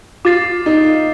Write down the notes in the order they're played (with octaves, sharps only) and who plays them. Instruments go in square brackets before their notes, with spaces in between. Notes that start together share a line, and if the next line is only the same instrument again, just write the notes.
[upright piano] F4 [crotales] D6 A6 C7
[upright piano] D#4